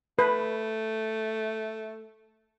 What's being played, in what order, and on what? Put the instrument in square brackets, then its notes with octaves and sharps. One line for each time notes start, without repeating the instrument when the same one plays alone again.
[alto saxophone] A3 [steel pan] B4